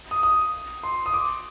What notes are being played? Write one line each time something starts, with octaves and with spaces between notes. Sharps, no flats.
D#6
D#6
C6
D#6
D6